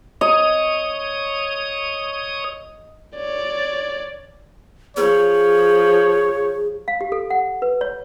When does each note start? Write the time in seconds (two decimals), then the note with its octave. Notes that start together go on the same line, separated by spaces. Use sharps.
0.21 C#5 D#5 D#6
3.16 C#5 D5
4.97 F3 G#4 C#5
6.88 F5
7.01 G4
7.12 A4
7.30 F#5
7.62 B4
7.81 C#5